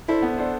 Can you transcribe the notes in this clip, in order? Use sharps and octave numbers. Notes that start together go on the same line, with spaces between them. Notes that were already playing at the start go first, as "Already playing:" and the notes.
D4 E4 A4 C5
B3
D4 A4 C5